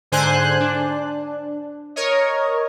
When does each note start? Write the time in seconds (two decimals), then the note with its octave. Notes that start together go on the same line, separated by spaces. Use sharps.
0.12 G#2 D3 C5 G#5 F#6
0.60 D4
1.96 A#4 C#5 D#5